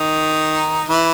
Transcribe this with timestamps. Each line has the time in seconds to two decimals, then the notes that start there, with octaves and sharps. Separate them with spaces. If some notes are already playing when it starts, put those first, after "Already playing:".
Already playing: D#3 D#4
0.88 E3 E4